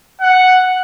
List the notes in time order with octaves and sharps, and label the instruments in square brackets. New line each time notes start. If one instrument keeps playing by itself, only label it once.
[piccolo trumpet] F#5